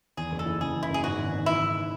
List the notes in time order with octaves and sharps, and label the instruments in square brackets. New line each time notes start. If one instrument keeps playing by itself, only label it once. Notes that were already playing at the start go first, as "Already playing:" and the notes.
[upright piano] E2 [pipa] G#4
[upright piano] F#1
[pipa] A4
[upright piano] E3
[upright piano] C#3 [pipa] G#4
[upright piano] E2
[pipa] E4
[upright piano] F#1 [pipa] G#4
[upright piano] G#2 [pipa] F#4
[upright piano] G#1
G#1
[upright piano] E3 [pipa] E4
[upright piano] G#2